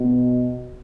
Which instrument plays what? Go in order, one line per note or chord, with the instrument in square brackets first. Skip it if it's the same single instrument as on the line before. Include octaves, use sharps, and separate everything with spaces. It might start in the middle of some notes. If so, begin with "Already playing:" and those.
Already playing: [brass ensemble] B2